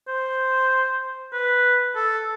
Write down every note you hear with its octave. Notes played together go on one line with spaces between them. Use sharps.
C5
B4
A4